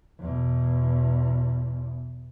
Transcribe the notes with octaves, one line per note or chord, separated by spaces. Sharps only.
E2 B2